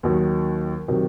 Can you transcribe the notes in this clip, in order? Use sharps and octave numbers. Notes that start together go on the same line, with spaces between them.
D#2 D#3 F#3
C3 D#3 F#3